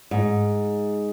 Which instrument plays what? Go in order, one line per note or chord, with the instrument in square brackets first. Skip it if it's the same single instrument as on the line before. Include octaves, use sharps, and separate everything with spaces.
[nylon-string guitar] G#2